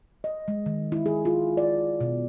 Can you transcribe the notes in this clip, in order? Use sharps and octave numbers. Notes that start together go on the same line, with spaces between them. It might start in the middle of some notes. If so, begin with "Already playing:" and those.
D#5
G#3
D#3
E4
G#4
F4
D5
B2